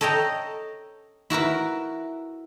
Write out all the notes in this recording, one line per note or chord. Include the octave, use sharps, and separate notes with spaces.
A4 C#5 D#5 G5 A#5
E4 F#4 A#4 B4